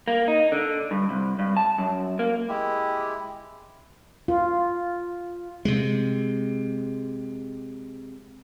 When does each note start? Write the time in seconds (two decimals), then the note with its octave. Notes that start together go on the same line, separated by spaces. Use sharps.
0.08 A#3
0.28 D#4
0.52 D3
0.91 G2
1.09 C2
1.39 G2
1.57 A5
1.78 F#2
2.19 A#3
2.48 G#3 E4 G4
4.28 F4
5.65 C3 G#3